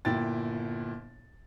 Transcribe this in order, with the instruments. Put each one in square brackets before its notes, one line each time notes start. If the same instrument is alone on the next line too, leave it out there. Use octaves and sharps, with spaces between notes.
[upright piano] G1 A#2 E4 G5 A6